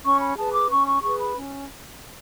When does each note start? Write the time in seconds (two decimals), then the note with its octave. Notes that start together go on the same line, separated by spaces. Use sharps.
0.04 C#4 C#6
0.20 B5
0.37 G#4 B4 A5
0.53 D6
0.69 C#4 C#6
0.86 C#6
1.02 G#4 B4 C#6
1.18 B5
1.35 C#4